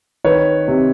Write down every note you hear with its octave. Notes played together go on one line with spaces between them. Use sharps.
D#3 B4 C#5
C3